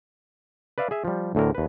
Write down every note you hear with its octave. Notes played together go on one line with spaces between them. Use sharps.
B4 D5 E5 F5
G#4 E5
F3 G3
D2 A2 D3 A#4
D#2 B4